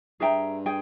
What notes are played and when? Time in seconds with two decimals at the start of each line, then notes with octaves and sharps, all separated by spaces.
0.20 G2 G#4 E5 G5 A#5
0.66 G#4 G5